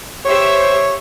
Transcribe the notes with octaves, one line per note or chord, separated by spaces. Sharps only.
G4 C5 C#5 E5